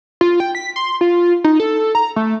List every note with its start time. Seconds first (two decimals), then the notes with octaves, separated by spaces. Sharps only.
0.21 F4
0.40 G5
0.55 B6
0.76 C6
1.01 F4
1.44 D#4
1.60 A4
1.95 A#5
2.16 A3